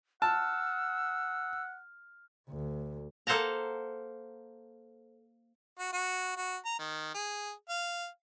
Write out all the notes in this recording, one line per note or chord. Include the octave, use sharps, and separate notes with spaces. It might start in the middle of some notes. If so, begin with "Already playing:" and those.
F#5 A5 E6 F6
D2
A#3 A4 C5 F#5 A5 A#5
F#4
F#4
F#4
A#5
D#3
G#4
F5